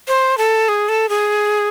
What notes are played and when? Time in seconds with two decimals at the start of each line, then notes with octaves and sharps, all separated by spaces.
0.08 C5
0.38 A4
0.68 G#4
0.89 A4
1.09 G#4